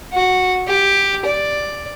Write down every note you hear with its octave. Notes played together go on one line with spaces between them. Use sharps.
F#4
G4
D5